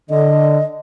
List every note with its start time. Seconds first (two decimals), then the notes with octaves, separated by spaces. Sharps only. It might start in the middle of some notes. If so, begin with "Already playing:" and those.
0.10 D3 D#5